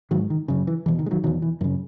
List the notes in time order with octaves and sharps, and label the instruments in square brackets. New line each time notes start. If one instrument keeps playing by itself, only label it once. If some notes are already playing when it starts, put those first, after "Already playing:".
[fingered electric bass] G#2 D#3 F#3
D#3
F#2 C#3
E3
E2 B2 E3
D#3
G#3
D#3 F#3
E2 B2 D#3 F#3
E3
F#2 D#3
C#3